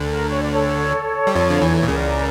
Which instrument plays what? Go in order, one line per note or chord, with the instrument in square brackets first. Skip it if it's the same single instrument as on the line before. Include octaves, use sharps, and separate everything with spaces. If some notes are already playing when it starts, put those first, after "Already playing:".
Already playing: [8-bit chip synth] D2 D3
[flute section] A#4
C#5
D5
A4 C#5
[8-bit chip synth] G3
F2 F3
D3
E2 E3
[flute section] C#5
[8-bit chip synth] A#2
[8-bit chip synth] C#2 C#3 [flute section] A#4 D5